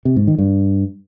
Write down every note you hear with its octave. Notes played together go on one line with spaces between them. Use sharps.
C3
G#2
D#3
G2